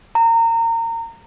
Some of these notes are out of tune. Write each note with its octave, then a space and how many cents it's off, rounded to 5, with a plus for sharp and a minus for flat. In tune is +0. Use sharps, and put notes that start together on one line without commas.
A#5 -25